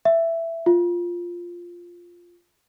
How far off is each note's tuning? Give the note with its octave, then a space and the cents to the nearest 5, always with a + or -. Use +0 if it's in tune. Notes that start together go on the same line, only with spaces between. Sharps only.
E5 +10
F4 +0